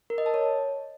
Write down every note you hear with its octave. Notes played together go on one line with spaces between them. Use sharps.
A#4
D#5
A5
C#5